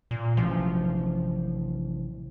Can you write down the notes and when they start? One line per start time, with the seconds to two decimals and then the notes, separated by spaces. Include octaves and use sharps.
0.11 A#2
0.37 A1 C3 F3 F#3